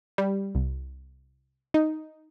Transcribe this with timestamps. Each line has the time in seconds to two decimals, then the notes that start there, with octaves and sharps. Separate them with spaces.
0.18 G3
0.55 C2
1.74 D#4